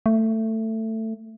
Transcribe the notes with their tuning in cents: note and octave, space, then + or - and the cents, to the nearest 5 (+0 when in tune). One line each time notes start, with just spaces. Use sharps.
A3 +15